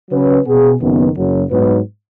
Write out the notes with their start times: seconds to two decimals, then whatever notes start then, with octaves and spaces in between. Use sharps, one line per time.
0.10 C#3 F#3 C#4 B4
0.46 B2 B3 G#4
0.80 F#1 F#2 D#3 B3
1.16 F#1 F#2 F#3
1.51 G#2 F#3 B3 D#4 B4